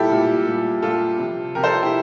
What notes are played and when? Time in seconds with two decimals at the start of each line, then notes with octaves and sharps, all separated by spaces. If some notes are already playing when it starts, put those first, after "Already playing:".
Already playing: A#2 G3 E4 G4 A4
0.10 A#2 G3
0.47 A#2 G3
0.82 A#2 G3 F4 A4
1.18 C3 F3
1.55 C3 F3 G4 A#4
1.63 A4 C5
1.82 E4 G4